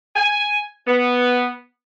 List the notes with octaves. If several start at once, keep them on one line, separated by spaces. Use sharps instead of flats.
G#5
B3